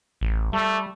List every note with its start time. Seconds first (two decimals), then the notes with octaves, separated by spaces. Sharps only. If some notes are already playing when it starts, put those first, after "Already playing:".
0.21 A1
0.53 G3 A3